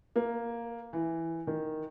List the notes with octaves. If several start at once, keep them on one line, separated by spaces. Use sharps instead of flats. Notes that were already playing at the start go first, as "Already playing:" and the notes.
A#3
E3
D#3